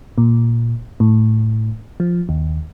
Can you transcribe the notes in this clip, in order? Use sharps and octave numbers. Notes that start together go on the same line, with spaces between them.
A#2
A2
F3
D#2